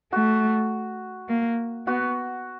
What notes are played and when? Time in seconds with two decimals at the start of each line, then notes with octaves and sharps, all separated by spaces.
0.12 A3 F#4
1.29 A#3
1.87 B3 F#4